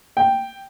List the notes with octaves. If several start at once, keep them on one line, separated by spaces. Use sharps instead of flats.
G5